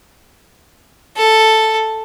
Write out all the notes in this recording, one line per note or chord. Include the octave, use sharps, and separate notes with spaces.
A4